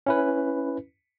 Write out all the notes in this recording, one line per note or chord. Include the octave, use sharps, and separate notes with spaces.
C#4 E4 B4